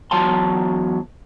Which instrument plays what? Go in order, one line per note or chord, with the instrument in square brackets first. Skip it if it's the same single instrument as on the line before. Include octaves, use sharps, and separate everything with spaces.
[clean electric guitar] E2 F#3 C#5 A5 C6